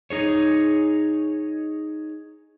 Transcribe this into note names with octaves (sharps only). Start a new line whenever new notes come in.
D#4 G#4 C#5